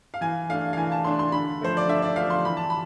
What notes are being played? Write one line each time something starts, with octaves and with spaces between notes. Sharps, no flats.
F5
E3 G#5
A3 D4 F5
F5
E3 G#5
A5
A3 D4 C6
C6
D3 B5
F3 A3 C5
D5
D3 E5
D5
F3 A3 F5
C6
E3 B5
A5
B5